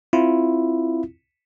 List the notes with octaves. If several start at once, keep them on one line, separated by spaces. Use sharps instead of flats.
C4 E4 F4